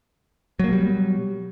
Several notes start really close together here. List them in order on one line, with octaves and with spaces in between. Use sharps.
F#3 A#3 B2 G3